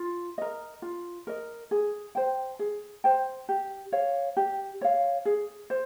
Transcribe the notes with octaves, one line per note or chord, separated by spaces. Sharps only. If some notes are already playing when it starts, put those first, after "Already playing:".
Already playing: F4
A#4 D#5
F4
A#4 D#5
G#4
C5 G5
G#4
C5 G5
G4
C#5 F5
G4
C#5 F5
G#4
C5